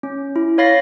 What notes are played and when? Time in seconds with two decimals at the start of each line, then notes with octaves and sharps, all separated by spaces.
0.03 C#4
0.36 E4
0.58 C#5 F5 B5 A6 A#6 C7